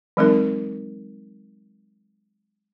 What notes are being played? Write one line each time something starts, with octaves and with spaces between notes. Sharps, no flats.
E3 F#3 G#3 C4 D#4 A#4